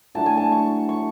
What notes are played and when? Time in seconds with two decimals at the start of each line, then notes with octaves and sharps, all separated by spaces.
0.15 A2 F#3 A3 D4 A5
0.26 G#5
0.37 A5
0.52 C#6
0.89 C#6